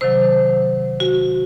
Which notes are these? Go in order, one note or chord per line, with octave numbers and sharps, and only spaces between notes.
C3 D#3 F#3 C5
F#4